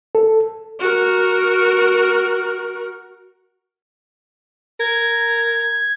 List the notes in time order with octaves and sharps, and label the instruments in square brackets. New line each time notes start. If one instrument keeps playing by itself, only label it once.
[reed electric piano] A4
[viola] F#4 A#4
[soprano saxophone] A#4 [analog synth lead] G#6